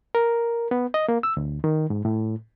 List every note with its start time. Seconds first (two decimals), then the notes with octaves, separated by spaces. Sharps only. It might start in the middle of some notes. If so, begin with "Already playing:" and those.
0.15 A#4
0.71 B3
0.94 D#5
1.08 A#3
1.23 E6
1.37 D2
1.64 D#3
1.90 G#2
2.05 A2